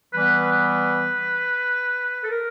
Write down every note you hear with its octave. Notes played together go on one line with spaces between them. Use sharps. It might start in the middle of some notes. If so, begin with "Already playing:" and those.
E3 G3 B3 B4
B4
A4
A#4